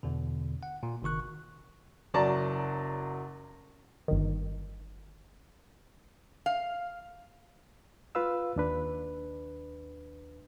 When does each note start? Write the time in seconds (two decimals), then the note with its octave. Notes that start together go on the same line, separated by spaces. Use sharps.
0.03 E2 B2 D3
0.63 F#5
0.83 A#2
1.02 G1 C3 D#3 C#6 F#6
2.14 F#1 F#3 D5 A5 A#5
4.08 G1 D#3
6.46 F5
8.15 F4 B4 F5 E6
8.56 D#2 D4 B4